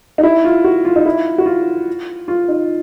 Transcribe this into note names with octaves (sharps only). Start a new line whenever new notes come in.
D#4
E4
F4
F#4
F4
D#4
E4
F#4
F4
F4
D#4